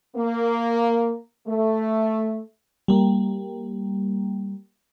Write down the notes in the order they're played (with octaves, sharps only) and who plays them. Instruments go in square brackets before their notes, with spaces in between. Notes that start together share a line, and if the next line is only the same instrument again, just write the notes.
[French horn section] A#3
A3
[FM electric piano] G3 A#3